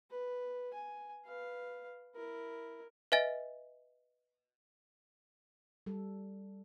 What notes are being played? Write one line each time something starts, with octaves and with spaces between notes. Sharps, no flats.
B4
G#5
B4 F5
E4 A#4
B4 D#5 E5 G#5 A6
G3 A4